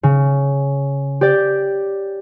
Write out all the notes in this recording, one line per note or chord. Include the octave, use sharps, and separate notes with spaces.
C#3
G4 D5